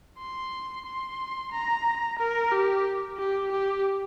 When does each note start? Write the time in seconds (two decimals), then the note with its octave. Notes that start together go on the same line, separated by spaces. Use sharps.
0.19 C6
0.85 C6
1.52 A#5
2.19 A#4
2.52 G4
3.18 G4
3.51 G4